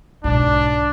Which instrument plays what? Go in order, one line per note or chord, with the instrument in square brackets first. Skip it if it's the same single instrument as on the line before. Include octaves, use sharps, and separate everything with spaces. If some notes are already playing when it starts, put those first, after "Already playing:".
[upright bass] B1 G#2 [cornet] D4